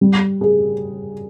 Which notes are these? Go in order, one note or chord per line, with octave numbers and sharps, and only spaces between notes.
G3
G#4